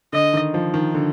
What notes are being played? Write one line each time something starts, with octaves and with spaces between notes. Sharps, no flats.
D3 D#5
D#3
F3
D#3
D3